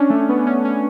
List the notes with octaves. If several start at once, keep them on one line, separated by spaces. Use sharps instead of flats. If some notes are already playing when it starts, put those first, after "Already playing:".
Already playing: C#4 D4
A3
B3
C#4
C#4